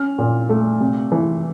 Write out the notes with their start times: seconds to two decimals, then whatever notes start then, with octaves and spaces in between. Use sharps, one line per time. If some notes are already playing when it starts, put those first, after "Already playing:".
Already playing: C#4 F6
0.18 A#2
0.49 A3
0.80 C3
1.12 E3